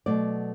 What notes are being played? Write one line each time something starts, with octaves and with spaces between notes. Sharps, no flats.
B2 F#3 A3 D5